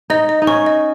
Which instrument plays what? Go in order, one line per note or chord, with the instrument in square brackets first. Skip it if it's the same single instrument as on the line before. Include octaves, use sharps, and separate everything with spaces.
[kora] D#4 [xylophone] D#5
[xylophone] D#5
[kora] D#4
[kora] C#4 [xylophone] C#6
[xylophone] D#5